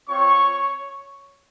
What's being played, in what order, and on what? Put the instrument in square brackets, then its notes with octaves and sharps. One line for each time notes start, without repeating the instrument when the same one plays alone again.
[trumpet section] C4 F4 C#5 C#6